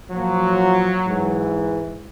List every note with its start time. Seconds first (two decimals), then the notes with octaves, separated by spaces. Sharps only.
0.11 A#2 F3 F#3
1.05 G#2 E3